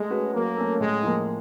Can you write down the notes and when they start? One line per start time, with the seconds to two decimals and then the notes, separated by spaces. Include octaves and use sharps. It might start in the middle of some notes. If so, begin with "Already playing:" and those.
Already playing: G#3 A3
0.10 C#4 F#4 B4
0.34 F#3 A#3
0.57 A3 C#4
0.80 A2 G#3
1.03 F3 A#3